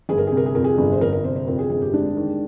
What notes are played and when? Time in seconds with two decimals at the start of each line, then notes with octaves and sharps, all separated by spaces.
0.09 G1 G#4
0.18 A#4
0.27 G#4
0.32 C3
0.37 A#4
0.46 G#4
0.55 F2 A#4
0.64 G#4
0.78 G1
0.92 C5
1.01 G1 A#4
1.13 A#4
1.24 C3 C5
1.36 C5
1.47 F2 A#4
1.59 G#4
1.70 G1 G#4
1.82 G4
1.93 G#3 D4
2.17 D#3